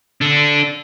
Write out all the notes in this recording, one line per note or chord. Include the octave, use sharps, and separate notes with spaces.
D4 A4